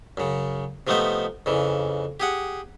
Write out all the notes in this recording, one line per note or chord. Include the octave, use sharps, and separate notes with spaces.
F#2 C#3
C3 F3 A3 B3 D#4 C5
F2 C#3 E3
G4 G#4 F#5